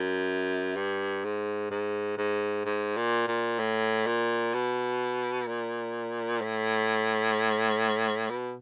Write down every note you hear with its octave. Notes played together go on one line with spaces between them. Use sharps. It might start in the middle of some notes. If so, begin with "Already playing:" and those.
Already playing: F#2
G2
G#2
G#2
G#2
G#2
A#2
A#2
A2
A#2
B2
A#2
A2
B2